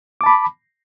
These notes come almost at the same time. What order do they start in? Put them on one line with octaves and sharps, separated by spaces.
D6 A5 B5